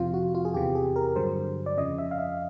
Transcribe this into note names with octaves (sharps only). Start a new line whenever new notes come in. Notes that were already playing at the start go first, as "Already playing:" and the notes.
Already playing: F2 C3 F3 F4
F#4
F4
G#4
E2 C3 E3 G4
G#4
A#4
G2 D3 F#3 C5
D5
F2 C#3 F3 D#5
E5
F5
E5